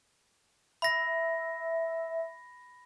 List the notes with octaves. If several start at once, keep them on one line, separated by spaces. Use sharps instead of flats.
E5 B5 A#6